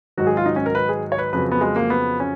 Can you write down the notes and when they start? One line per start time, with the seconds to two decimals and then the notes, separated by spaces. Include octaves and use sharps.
0.18 G#2 D#3 F#3 F#4
0.27 G#4
0.37 F4
0.46 D#4
0.56 C#4
0.66 A#4
0.75 B4
0.89 G#4
1.12 C#5
1.18 B4
1.33 F2 C#3 F#3 B4
1.52 B3
1.61 G#3
1.76 A#3
1.90 B3
2.20 C#4